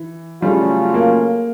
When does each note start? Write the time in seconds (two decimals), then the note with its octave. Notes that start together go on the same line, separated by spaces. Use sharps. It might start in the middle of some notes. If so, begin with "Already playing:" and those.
Already playing: E3
0.42 C#3 F#3 G3 A3 C#4 F4
0.94 A#3